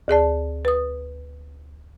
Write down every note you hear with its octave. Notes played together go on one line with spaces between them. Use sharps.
D2 G#4 D5 A5
B4 D#6